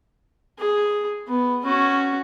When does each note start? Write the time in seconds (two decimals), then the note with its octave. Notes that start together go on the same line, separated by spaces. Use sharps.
0.59 G#4
1.28 B3
1.65 C#4 F#4